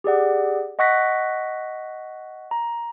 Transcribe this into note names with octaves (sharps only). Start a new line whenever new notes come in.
G4 G#4 D5 F#5
D#5 F#5 C#6 F#6 A#6 B6
A#5